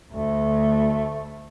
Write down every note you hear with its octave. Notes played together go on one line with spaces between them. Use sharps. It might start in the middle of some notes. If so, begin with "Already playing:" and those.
D2 A3